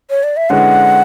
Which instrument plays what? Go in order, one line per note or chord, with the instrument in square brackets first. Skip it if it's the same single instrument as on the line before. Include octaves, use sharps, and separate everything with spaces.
[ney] C#5
D5
E5
[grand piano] D3 G#3 C#4 E4 B4 [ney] F#5